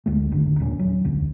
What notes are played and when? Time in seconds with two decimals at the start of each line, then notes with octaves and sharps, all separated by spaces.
0.06 D2 G#3 A3
0.31 G#1 F2 D3 D#3
0.60 D#2 A#2 C#4 D4
0.79 D#1 F#3 C#4
1.04 D1 B1 F2 D3